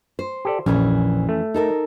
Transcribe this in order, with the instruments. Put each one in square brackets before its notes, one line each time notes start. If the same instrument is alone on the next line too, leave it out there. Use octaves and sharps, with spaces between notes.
[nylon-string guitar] C5
[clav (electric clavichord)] G4 A4 D5
[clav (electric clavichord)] A#1 [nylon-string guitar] F2 E3 C#4
[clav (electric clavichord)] A3
[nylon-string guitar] D#4 A4 A#4